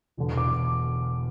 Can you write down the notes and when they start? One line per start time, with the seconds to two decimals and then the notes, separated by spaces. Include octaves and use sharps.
0.17 E1 E2 D3
0.37 D6